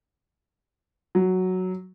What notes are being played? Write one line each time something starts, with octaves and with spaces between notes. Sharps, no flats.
F#3